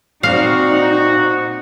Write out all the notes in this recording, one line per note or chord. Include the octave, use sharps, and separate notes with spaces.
A#2 C4 D#4 F#4 D5 F5